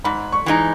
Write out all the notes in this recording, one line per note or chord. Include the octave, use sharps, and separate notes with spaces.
G#2 B5
C#6
E3 G#3 D#4